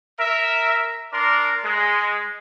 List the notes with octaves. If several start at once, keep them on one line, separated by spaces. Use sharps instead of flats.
A#4 E5
D4 A#4 D5 C6
G#3